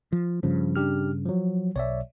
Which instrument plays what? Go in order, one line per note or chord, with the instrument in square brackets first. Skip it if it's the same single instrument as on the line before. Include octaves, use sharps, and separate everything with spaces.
[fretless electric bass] F3
[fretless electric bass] G2 C#3 [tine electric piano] F3
[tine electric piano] D4 G4 F6
F3 F#3
[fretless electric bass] B1 [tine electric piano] C#5 D5 E5